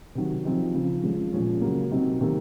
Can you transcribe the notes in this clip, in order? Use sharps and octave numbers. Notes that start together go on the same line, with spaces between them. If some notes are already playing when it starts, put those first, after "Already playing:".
C3 D#3 F#3
F3 C4 D#4
C#3 F3 C4
F3 G#3 C#4
A#2 F3 G#3 C#4
C#3 F#3 A#3
C3 F#3 C4 D#4
C3 D#3 A#3